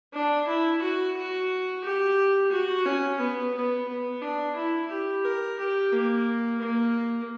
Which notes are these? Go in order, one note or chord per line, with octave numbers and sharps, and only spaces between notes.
D4
E4
F#4
F#4
G4
F#4
C#4
B3
B3
B3
D4
E4
G4
A#4
G4
A#3
A#3